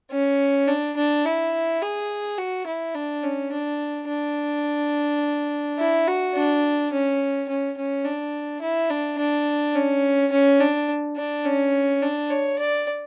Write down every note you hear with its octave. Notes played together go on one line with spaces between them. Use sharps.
C#4
D4
D4
E4
G#4
F#4
E4
D4
C#4
D4
D4
E4
F#4
D4
C#4
C#4
C#4
D4
E4
D4
D4
C#4
C#4
D4
D4
C#4
D4
C#5
D5